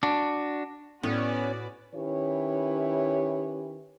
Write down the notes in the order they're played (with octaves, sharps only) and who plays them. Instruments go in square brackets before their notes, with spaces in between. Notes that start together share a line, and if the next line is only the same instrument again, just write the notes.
[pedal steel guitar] D4 F#4
[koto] A2 [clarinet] B3 [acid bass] C#4 [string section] F#4 B4 D5
[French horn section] D#3 C#4 E4 G4 B4 C#5